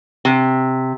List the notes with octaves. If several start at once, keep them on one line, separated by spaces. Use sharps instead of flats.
C3